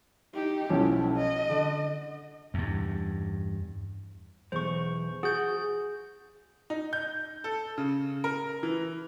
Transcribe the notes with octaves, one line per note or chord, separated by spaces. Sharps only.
D#4 G4
B1 F3 C#4 E4
D#5
D3
E2 G2
B1 E2 C5 C#6
F#4 G#4 G6
D#4
G6
A4
C#3
A#4
E3